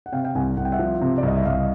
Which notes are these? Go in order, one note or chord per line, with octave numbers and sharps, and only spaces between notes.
F#5
C3 F5 G5
F5 G5
C2 F#5 G#5
C2 F#5
G5
E5 F#5
F3
C3
D5
C2 D#5
E5
C2 D#5 F5